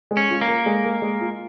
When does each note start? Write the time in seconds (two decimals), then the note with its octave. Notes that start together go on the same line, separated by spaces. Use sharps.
0.11 G#3
0.17 C#4
0.30 F4
0.41 A#3
0.48 A#4
0.66 G#3
0.84 A#4
1.02 G#3
1.21 F4